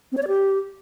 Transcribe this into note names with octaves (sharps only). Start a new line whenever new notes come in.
C4
C#5
D5
G4